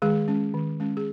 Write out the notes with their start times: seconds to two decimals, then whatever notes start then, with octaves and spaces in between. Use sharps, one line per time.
0.02 D#3 G#3 G#4
0.28 G#3 C#4
0.54 D#3
0.80 G#3 C#4
0.97 G#4